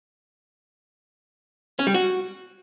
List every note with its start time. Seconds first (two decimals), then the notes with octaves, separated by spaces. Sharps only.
1.79 C#4
1.87 G3
1.94 F#4